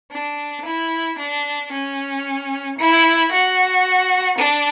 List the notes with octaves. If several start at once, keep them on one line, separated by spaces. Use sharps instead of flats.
D4
E4
D4
C#4
E4
F#4
D4